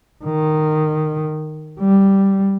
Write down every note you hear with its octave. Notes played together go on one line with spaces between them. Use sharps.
D#3
G3